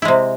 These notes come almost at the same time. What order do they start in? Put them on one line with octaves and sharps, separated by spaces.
E4 G#3 C3